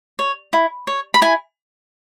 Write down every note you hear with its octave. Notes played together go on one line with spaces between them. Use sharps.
C#5
E4
C#5
B5
E4 G#5